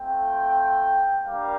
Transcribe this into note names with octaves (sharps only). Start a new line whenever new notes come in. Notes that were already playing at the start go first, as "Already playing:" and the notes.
Already playing: A3 C4 F4 G5
G3 A#3 D4 G4 F5